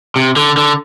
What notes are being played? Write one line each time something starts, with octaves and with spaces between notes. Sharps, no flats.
C3
D3
D3